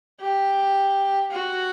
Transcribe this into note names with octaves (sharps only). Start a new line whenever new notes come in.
G4
F#4